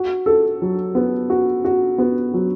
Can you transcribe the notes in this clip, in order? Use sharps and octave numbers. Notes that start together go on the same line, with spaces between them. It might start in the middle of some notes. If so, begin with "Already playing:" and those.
Already playing: F#4
A4
F#3
B3
F#4
F#4
B3
F#3